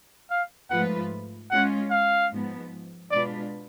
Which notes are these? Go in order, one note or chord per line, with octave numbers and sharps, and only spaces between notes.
F5
G#2 F3 A3 F4 B4 F#5
G#3 C#4 F4 F#5
F5
G#2 F3 B3
B2 G#3 D4 F4 B4 D5